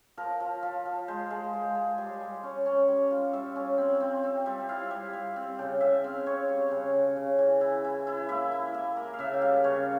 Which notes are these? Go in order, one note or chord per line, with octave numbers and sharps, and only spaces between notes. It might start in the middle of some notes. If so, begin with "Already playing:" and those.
F3 A#4
F3
F3
F3
G#3 C5
G#3
G#3
G#3
G3
G3
C#4
C#4
G3
F4
G3 E5
C#4
C4
C4
C4
G3
E4 F5
G3
G3
C4
C#3 G5
C#3 E5
C4 F5
C4 C#5
G3
C#3
C#3
C#3
E3
E4
E4
E4
A#3 E5
E4
A#3 E5
A#3
F5
C#3 E5
G5
G3 F5
C#3 C#5